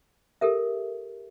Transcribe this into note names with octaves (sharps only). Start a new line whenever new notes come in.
G4 A4 A#4 E5